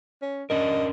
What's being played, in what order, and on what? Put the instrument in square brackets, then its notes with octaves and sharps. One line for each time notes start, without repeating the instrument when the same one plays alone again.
[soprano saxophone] C#4
[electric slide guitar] C#4 D4 A#4 [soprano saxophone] D#5